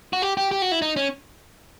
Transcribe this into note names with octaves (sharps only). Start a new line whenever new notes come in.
F#4
G4
G4
G4
F#4
E4
D#4
C#4